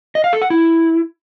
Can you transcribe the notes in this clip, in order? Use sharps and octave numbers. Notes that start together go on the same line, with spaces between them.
D#5
F5
A4
F#5
E4